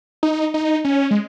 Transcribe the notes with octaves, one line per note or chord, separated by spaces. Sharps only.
D#4
D#4
C#4
G#3